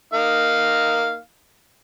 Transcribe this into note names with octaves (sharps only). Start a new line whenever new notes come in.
A#3 D#4 F5